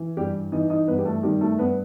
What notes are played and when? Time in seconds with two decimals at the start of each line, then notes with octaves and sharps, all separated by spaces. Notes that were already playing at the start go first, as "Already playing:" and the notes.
Already playing: E3
0.17 G2 G3 G4
0.52 E3 D#4 D#5
0.70 D#4 D#5
0.88 G2 B3 B4
0.98 G4
1.05 A3 A4
1.23 D#3 G3 G4
1.41 A3 A4
1.58 G2 B3 B4